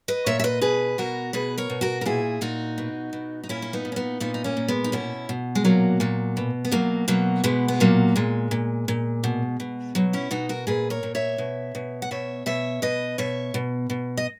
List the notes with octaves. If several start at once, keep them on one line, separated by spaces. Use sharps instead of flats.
B4 D#5
A#2 C#5 E5
E5
B4 D#5
B2 G#4 B4
B2 F#4 A#4
B2 G#4 B4
A#4 C#5
B2
F#4 A#4
A#4
A#2 E4 G#4
A#2 D#4 F#4
B2
B2
D#4
A#2 C#4 E4
C#4
B3 D#4
A#2
C#4
B3 D#4
A#2 B3 D#4
D#4
A#3 C#4
A#2
G#3 B3
D#4
B2 C#4 E4
B2
G#3
A#2 F#3 A#3
A#2 F#3
B2
B3
B2 F#3 A#3
B2 F#3 A#3
B2 G#3 B3
B3
A#2 F#3 A#3
A#2 G#3
A#2
A#2
B2
B2
B2 F#3
C#4 E4
B2 D#4 F#4
F#4 A#4
A#2 G#4 B4
A#4 C#5
A#2
C#5 E5
B2
B2
F#5
B2 C#5 E5
B2 C#5 E5
B2 B4 D#5
B2 C#5 E5
B2
B2
D#5